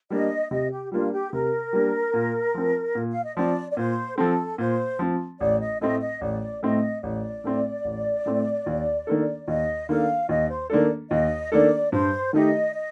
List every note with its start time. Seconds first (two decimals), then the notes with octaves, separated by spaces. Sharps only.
0.10 G3 A#3 D4 D#5
0.51 C3 D#5
0.71 G4
0.92 G3 A#3 D4 F4
1.12 G4
1.32 C3 A#4
1.73 G3 A#3 D4
2.14 A#2
2.54 F3 C4
2.95 A#2
3.11 F5
3.24 D#5
3.36 F3 C4 D5
3.71 D5
3.77 A#2 C5
4.17 F3 C4 A4
4.58 A#2 C5
4.99 F3 C4
5.40 A1 D5
5.60 D#5
5.81 A2 A3 C4 D#5
6.01 D#5
6.21 A1 D5
6.62 A2 A3 C4 D#5
7.03 A1 D5
7.44 A2 A3 C4
7.85 A1
8.26 A2 A3 C4
8.66 D#2
9.07 D#3 A#3 D4 A4
9.47 D#2 D#5
9.89 D#3 A#3 D4 A4 F5
10.29 D#2 D#5
10.49 C5
10.70 D#3 A#3 D4 A4 D5
11.11 D#2 D#5
11.51 D#3 A#3 D4 A4 D5
11.92 G2 C5
12.33 D#3 A3 D#4 G4 D#5
12.74 D#5